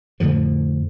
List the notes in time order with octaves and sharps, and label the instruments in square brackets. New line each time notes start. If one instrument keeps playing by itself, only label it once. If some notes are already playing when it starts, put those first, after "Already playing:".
[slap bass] F2 A2 D3 F3